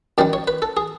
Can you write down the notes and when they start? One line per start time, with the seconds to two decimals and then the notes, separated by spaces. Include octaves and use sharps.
0.18 F#2 D#3 G3 D5
0.33 C#5
0.48 B4
0.62 A4
0.77 G#4